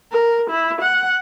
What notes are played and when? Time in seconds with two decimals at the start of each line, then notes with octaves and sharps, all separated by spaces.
0.12 A#4
0.51 E4
0.81 F#5